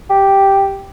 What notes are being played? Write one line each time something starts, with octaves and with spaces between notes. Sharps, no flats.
G4